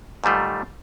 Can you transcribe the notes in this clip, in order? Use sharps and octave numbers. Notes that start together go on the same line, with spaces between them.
G#2 D#3 G3 A3 F4